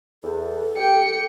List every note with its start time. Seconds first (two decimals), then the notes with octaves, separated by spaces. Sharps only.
0.24 E2 A4
0.77 G4 G5 C#7